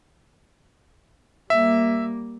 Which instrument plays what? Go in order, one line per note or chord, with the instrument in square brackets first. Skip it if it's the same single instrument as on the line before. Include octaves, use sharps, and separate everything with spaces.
[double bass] G3 A#3 [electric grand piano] E5